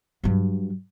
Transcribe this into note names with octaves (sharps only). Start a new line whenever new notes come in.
G2 F#3